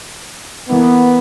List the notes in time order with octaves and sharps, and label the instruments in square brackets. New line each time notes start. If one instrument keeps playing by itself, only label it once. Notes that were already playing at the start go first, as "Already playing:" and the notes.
[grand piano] E3 A#3 E4 [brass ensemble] B3